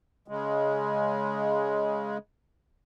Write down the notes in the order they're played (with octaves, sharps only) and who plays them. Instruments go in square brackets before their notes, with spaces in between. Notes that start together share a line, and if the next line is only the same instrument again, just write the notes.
[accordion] C#3 G#3